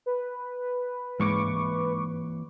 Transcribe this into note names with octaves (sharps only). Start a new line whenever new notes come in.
B4
G#2 E3 A#3 C4 C#6 D6